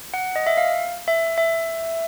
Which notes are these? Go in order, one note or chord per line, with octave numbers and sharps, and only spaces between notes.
F#5
D#5
E5
F5
E5
E5